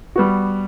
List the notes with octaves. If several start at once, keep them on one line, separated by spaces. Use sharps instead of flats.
G3 B3 F#4